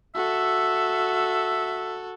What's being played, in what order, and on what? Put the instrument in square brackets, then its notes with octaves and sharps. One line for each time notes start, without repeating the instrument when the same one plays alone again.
[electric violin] F#4 A4 [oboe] E5